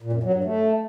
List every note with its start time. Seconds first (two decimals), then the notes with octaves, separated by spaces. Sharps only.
0.02 A#2
0.13 F#2
0.23 F#3
0.34 G2
0.44 A3